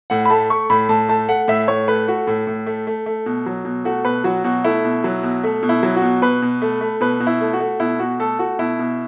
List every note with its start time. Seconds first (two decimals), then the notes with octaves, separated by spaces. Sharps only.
0.10 A2 F#5
0.25 B5
0.30 A3 A5
0.50 A3 C#6
0.70 A2 B5
0.89 A2 A5
1.09 A3 A5
1.29 A3 F#5
1.48 A2 E5
1.68 A2 C#5
1.88 A3 B4
2.08 A3 F#4
2.27 A2
2.47 A2
2.67 A3
2.87 A3
3.06 A3
3.26 B2
3.46 F#3
3.65 B2
3.85 A3 F#4
4.05 B2 B4
4.24 F#3 F#4
4.44 B2 F#4
4.64 A3 E4
4.84 B2
5.04 F#3
5.23 B2
5.44 A3
5.63 B2
5.69 E4
5.83 F#3
5.96 F#4
6.02 B2
6.22 B2 B4
6.42 B2
6.62 A3
6.81 A3
7.01 B2 B4
7.20 B2
7.27 E4
7.41 A3
7.53 F#4
7.60 A3
7.80 B2 E4
7.99 B2 F#4
8.20 A3 A4
8.39 A3 F#4
8.59 B2 E4
8.79 B2